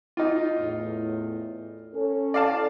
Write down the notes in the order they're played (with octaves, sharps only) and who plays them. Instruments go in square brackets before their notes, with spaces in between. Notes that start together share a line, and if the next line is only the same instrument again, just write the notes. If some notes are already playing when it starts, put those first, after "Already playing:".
[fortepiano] D#4 F4
[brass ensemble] E2 A2
C#4 A4
[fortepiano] D5 F5 A5